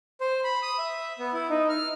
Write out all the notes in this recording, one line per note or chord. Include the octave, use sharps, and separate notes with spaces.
C5
B5
D#6
E5
B3
E4
D#4
F6